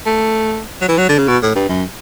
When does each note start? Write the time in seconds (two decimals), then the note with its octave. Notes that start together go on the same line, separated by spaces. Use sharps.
0.06 A3
0.82 F#3
0.88 E3
0.98 F#3
1.09 D3
1.18 C#3
1.28 B2
1.43 A2
1.56 G2
1.69 F#2